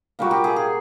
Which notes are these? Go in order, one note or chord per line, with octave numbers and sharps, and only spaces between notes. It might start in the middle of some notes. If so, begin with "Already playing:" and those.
A#2 G3 A#3 F#4
G4
G#4
G#4